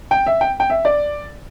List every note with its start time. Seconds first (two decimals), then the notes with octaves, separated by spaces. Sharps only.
0.11 G5
0.26 E5
0.41 G5
0.60 G5
0.70 E5
0.85 D5